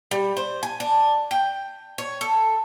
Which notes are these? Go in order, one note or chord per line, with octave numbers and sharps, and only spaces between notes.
G3
C5
G#5
D4
G5
C#5
A4